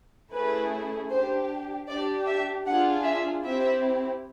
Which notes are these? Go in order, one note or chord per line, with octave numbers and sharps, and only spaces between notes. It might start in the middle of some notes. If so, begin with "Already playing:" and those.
A3 C#4 E4 G#4 B4
D4 G4 C5
D4 G4 D5
E5
D4 F4 G#4 F#5
E5
C4 E4 G4 E5